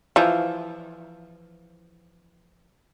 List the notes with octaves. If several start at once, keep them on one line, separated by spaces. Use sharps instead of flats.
E3 F3